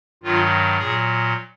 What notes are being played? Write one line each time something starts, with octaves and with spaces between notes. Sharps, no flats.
G2 D#3 F#3 F4
A#2 F#3 G#4